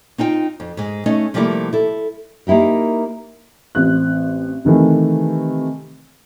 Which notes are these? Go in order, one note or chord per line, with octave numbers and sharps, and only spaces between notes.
C4 D#4 F4 G5
F2
G#2 G#3
A3 C#4 D#4 D#5
C3 F3 G3 A3 A#3 E4
E4 A4
A#3 D#4 E4 G4 A#4
A1 C4 F#6
C3 D#3 E3 A3